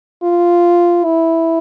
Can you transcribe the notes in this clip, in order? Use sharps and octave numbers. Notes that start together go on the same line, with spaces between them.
F4
E4